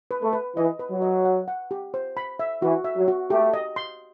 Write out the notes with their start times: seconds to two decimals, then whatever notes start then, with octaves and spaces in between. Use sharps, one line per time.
0.11 B4
0.22 A3
0.33 B4
0.56 E3 D#5
0.79 B4
0.91 F#3
1.02 D#5
1.25 F#5
1.48 F#5
1.71 G4
1.94 C5
2.17 B5
2.39 E5
2.62 E3 F#4
2.84 E5
2.96 F#3
3.08 F#4
3.30 A3 G4
3.54 D#5
3.76 C6